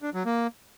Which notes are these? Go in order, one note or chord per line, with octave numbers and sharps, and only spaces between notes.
D4
F#3
A#3